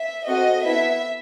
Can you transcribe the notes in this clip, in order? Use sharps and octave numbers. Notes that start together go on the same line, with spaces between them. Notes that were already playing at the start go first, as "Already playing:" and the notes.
Already playing: E5
C4 F#4 A4 D#5
B3 E4 A4 E5